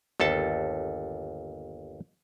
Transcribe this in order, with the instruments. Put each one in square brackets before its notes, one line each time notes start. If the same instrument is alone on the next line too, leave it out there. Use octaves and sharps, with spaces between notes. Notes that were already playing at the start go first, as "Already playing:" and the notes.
[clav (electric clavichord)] G1 D#2 A4 A5